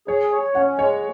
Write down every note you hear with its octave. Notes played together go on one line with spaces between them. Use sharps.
G#4 C#5
C#5
C#4 F#5
G#3 C#5